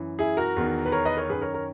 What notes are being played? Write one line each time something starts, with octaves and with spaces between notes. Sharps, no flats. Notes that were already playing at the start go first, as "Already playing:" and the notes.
Already playing: F#2 E3
E4 G#4
F#4 A#4
E2 D#3
B4
A#4 C#5
B4 D#5
A#4 C#5
F#2 D#3 G#4 B4
A#4 C#5
A#4 C#5